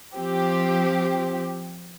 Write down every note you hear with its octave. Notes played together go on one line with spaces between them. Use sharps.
F3 C4 G4